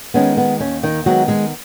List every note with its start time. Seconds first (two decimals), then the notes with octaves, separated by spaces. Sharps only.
0.14 D#3 G#3 B3 C#4
0.37 B3
0.60 D#2 C#4
0.83 D#3 D#4
1.06 D#3 F#3 G#3 B3 F#4
1.28 G#3 G#4